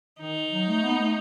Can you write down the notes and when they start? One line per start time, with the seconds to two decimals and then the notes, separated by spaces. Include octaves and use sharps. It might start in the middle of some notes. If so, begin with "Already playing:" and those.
0.20 D#3 D#4
0.52 F#3
0.68 A3
0.83 B3
0.98 A3